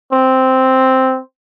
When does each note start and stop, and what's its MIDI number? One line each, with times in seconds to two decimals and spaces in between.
0.12 1.19 60